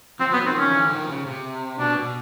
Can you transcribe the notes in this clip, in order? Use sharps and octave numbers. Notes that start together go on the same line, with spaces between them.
F3 C4
F#3 B3
D#3 F3 C4
C#4
D3 E3
D#3 F3
C#3
C3
B2 D4
B2